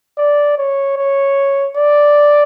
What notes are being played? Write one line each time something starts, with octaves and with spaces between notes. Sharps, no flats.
D5
C#5
C#5
D5